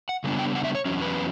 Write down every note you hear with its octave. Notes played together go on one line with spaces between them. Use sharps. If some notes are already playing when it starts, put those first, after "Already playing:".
F#5
C#3 G3 B3 D4
G5
F#5
E5
C#5
E2 C#3 F#3 C#4
B4